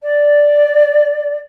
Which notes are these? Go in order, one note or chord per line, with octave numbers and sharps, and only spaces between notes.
D5